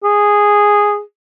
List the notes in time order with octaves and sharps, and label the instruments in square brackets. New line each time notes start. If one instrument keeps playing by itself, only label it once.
[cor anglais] G#4